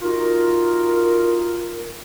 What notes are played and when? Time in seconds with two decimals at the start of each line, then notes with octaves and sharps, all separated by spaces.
0.02 D#4 F4 F#4 A#4